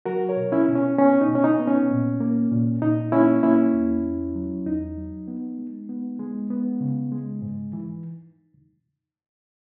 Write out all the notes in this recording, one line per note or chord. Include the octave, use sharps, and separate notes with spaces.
F#3 F#4 A#4
A#4 C#5
B2
C#4 E4
B2
C#4
B3 C#4
D#4
B2
C#4
D#4
B3
C#4
A#2
A#3
A#2
A#2 D#4
A#3 C#4 E4
A#3 C#4 E4
E2
E2
F#3
E2 D#4
F#3
B3
G#3
B3
G#3
B3
C#3
G#3
G#2
E3